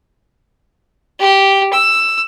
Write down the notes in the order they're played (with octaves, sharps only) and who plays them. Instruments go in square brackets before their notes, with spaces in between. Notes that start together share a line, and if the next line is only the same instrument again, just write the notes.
[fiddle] G4
E6